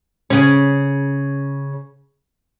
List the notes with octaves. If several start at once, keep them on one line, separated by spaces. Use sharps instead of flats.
C#3 C#4